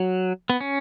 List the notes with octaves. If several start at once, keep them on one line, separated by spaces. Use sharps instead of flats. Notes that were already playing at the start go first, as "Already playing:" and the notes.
Already playing: F#3
B3
C#4